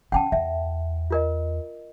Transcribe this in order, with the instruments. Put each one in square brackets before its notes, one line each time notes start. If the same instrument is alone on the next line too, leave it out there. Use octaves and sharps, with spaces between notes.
[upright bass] E3 C#4 [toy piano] F#5 G5 A5
[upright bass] E2 [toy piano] E5
[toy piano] F4 A#4 D#5